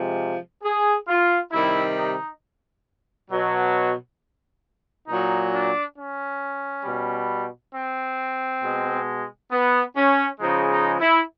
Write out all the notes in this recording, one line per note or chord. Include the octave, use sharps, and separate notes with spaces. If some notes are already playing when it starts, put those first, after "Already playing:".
Already playing: C3 F3 G#3
G#4
F4
C3 D#3 G3 E4
D#4
B2 F#3
A#2 F#3 D#4
D4
C#4
B2 G3
C4
B2 G#3
B3
C#4
C#3 F3 G#3 D#4
D#4
E4